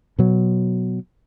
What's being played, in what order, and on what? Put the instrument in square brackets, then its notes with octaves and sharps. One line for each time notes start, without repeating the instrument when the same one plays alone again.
[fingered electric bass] B2 F#3